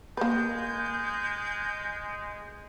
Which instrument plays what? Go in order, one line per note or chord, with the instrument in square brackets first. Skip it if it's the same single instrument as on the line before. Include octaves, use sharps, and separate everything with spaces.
[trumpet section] G#3 [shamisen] A#3 B4 [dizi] G6